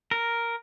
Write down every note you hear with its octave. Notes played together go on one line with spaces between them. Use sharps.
A#4